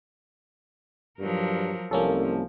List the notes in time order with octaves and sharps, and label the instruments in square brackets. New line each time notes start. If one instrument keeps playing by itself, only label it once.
[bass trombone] G2 [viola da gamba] F3 F#3 A#4
[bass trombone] C2 [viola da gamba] F3 [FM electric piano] A#3 C#4 A4